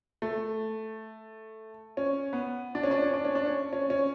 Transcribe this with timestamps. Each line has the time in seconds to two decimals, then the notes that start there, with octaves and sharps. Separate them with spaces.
0.22 A3
1.97 C#4
2.33 B3
2.75 D4
2.83 C#4
2.91 D4
3.02 C#4
3.14 D4
3.25 C#4
3.35 D4
3.46 C#4
3.73 C#4
3.90 C#4